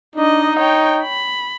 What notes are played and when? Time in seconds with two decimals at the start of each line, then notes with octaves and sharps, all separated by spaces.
0.16 D4 D#4 D#5
0.59 C#5 G5
1.03 B5